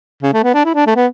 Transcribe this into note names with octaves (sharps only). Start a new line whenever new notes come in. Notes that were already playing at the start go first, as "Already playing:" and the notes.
C#3
A3
B3
D4
E4
D4
A3
B3